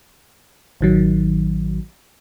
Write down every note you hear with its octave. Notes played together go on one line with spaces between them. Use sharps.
A1 D#3 F#3